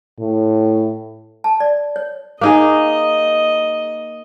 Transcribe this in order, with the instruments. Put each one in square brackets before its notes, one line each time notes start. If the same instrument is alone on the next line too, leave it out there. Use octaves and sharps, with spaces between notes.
[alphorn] A2
[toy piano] A5
D5
C#5
[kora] A#3 D#4 G#4 [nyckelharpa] D#5